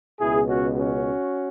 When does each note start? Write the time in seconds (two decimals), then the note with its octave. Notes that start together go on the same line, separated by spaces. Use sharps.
0.20 C#2 B2 E4 G#4
0.48 C#4 F#4
0.76 C#4 F#4